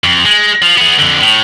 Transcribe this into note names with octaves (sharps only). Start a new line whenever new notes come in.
F2
G#3
F3
B3 G#4
F2 D3
A2